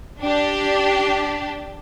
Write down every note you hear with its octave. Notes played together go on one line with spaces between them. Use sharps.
D4 G4